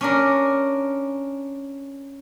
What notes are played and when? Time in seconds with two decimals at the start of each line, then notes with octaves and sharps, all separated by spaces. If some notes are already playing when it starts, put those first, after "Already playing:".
0.01 C#4 D4 A#4